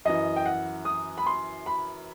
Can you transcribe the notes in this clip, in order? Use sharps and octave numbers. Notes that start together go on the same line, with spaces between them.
F#2 E3 D#5
G5
F#5
D#6
B5
C6
B5